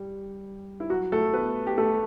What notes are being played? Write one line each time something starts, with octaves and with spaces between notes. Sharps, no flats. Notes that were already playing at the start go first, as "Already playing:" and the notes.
Already playing: G3
E4
F#3 F#4
A3 A4
B3 B4
G4
A3 A4